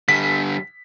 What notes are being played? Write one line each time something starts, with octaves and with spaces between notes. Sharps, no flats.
D3 G3 B6